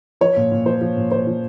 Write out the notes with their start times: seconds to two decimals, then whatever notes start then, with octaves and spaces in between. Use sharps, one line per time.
0.21 F3 C#5
0.37 A#2
0.52 A#2
0.66 F3 C5
0.81 F3
0.97 A#2
1.11 A#2 C5
1.27 F3